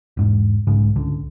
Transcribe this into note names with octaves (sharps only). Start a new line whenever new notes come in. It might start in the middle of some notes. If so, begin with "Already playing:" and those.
E1 G#2
B1 G#2 C#3 G#3
C#2 D3